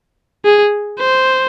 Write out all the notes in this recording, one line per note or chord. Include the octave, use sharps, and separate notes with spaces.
G#4
C5